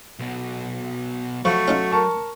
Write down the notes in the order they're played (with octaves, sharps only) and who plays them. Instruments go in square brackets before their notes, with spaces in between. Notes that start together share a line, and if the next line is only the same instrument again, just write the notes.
[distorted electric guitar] B1 B2
[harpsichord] F3 [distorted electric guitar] F#3 B5 [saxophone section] A3 F#4 [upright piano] C#6
[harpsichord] C#4 D#4 F4
[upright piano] A#4 A5 C#6